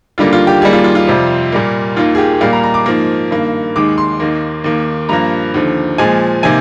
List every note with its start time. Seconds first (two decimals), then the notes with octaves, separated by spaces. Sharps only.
0.18 D#2 D3 G3 A#3 F4
0.33 F4
0.47 G4
0.62 D#2 D#3 G3 A#3 G#4
0.73 F4
0.84 F4
0.95 F4
1.07 F2 C3 G3
1.52 A#2 G3 A#3
1.96 D#2 D#3 A#3 F4
2.15 G#4
2.18 G4
2.41 A#2 G3 A#3 F5
2.53 A#5
2.64 A#5
2.74 D6
2.86 G#2 F3 A#3
3.31 G2 D#3 A#3
3.76 D#2 D#3 G#3 D6
3.98 C6
4.20 D#2 D#3 A#3
4.64 D#2 D#3 A#3
5.09 G2 F3 A#3 A#5
5.54 D#2 D3 F3
5.98 A#2 F3 G#3 G#5
6.43 C3 D#3 A#3 G#5